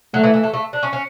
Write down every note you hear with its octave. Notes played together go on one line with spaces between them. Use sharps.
F#3 A3
E3
E3
A3
A3
D4
C#4
C#4